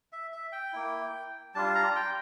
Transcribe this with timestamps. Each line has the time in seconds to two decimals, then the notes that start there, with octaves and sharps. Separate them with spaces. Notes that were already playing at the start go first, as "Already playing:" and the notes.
0.12 E5
0.32 E5
0.52 G5
0.73 A#3 E4
1.55 G3 D4 F4 A5
1.75 A#5
1.96 G5